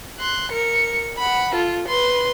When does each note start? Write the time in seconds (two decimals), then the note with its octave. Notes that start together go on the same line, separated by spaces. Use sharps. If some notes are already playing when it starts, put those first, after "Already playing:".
0.20 C6 F#6
0.52 A#4 C#7
1.18 F#5 B5
1.55 F4 A4
1.86 B4 C6